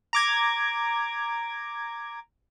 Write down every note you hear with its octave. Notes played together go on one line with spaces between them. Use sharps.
A#5 D6 G#6